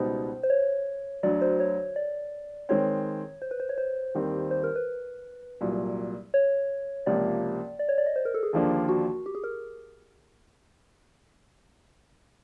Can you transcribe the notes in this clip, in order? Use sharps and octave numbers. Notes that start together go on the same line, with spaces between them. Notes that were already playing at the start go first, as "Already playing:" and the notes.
Already playing: C#2 B2 G3 B3 D#4 C5
C5
C#5
D2 D3 F#3 D5
C5
C#5
D5
D#3 G#3 C4 C#5
C5
B4
C5
C#5
C5
D#2 D#3 G3 C4
C5
A#4
B4
C2 A#2 F#3
C#5
C#2 C3 F3 A#3 D5
D5
C#5
D5
D#5
C5
A#4
A4
G#4
D#2 D3 F3 A#3 D4
F#4
G4
G#4
A#4